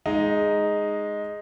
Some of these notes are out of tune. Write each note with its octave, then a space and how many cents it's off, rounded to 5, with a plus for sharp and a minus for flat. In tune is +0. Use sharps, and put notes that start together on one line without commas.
G#3 +0 D#4 +0